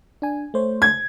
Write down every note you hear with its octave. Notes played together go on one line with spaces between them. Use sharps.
D4 G#5
A3 C5 C#5
G#6